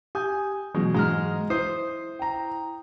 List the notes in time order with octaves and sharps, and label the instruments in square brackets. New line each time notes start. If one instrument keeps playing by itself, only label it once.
[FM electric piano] G4 [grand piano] G#5 D#6 G6
[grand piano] B2 [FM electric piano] E3 F#3 [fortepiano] G#3
[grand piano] G#2 [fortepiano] G#3 A#5 F6
[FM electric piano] E4 [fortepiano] C5 [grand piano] D#6 C7
[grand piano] G5 A#5